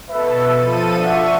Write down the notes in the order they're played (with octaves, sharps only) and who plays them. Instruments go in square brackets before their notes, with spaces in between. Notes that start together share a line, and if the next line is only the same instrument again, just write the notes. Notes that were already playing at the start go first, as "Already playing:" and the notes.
[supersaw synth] B2 A4 [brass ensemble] B4 E5
[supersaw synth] F3 A4 D#7
[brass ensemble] D4 E5 F#5 [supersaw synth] C#6